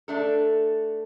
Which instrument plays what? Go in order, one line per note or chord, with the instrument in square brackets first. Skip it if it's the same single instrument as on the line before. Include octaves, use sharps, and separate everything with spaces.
[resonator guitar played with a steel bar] A3 D4 A4